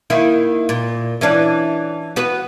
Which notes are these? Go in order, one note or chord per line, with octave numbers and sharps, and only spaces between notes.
D#3 A#3 E4
A#2
E3 C#4 D4
B3 F#4 B4